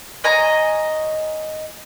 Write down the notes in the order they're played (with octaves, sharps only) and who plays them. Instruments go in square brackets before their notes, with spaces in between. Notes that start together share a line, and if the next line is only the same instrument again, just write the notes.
[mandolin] C#5 D#5 G#5 A#5